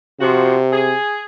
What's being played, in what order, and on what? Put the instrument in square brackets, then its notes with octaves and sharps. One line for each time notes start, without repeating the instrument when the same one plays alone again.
[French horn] C3 [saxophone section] F3 F#4
[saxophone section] G#4